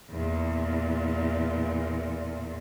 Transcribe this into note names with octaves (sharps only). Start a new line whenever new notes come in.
E2 A#2